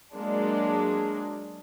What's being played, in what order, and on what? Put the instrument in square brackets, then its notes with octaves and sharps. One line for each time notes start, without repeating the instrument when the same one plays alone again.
[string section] F#3 G#3 A#3 D4